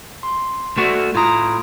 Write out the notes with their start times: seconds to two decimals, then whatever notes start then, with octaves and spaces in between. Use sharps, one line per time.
0.23 C6
0.77 A3 F#4
1.15 A2 F4 A#5 D#6 D7